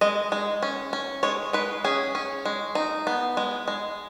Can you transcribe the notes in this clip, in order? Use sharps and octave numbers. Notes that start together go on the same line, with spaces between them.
G#3 D#5
G#3
C#4
C#4
G#3 C#5
G#3 B4
C#4 G#4
C#4
G#3
D#4
B3
G#3
G#3